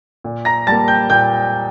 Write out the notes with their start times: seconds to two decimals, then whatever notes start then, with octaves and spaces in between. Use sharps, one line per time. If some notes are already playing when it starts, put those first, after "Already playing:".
0.24 A#2
0.45 A#5 A#6
0.67 G3 A5 A6
0.72 A#3
0.88 G5 G6
1.09 A#2 G5 G6